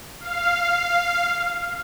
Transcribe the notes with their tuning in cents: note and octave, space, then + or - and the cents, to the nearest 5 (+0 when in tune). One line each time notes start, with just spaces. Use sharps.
F5 -5